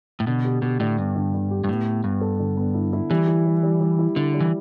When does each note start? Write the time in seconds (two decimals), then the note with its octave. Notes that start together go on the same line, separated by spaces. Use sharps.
0.20 A2
0.27 B2 D3
0.45 G4
0.62 B2 G4
0.80 A2 D3
0.98 G2 B3
1.16 D3
1.34 D3
1.51 G4
1.64 G2
1.69 A2 B3
1.86 B3
2.04 G2 B3
2.21 A4
2.40 D3
2.57 B3
2.74 E4
2.93 E4
3.10 E3 G3
3.27 E4
3.46 G3
3.63 G3
3.81 G3
3.99 E4
4.16 D3 E4
4.34 G3
4.40 E3